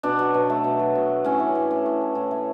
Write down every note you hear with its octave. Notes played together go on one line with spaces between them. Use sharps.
B2 D4
F#3
B2
A3
B2
F#3
B2
A3
A2 C#4
E3
A2
A3
A2
E3
A2
A3